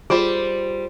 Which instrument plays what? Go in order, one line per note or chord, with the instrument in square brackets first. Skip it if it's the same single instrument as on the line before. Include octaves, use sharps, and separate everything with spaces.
[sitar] G3 C5 [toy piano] F4 G#4